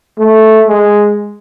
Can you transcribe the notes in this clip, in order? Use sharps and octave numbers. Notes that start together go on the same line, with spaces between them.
A3
G#3